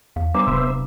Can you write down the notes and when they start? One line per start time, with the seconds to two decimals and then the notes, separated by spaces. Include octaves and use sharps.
0.16 E2 F5
0.34 G3 B3 D4 C5 E5 A#5 D6
0.47 D#1 C3 F#3 B4 B5 D#6